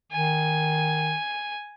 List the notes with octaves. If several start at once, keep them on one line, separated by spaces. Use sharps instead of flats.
D#3 G#5